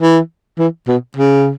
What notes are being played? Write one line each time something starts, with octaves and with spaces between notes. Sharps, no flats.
E3
E3
B2
C#3